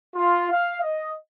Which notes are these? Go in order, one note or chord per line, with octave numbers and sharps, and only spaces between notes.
F4
F5
D#5